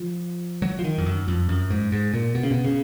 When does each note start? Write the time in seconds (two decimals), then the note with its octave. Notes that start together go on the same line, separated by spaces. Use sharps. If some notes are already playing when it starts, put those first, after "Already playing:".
Already playing: F3
0.62 F#3
0.79 F3
0.84 D#3
0.98 F2
1.06 F#2
1.28 F2
1.49 F#2
1.70 G#2
1.92 G#2
2.14 A#2
2.35 B2
2.43 C#3
2.51 B2
2.65 C#3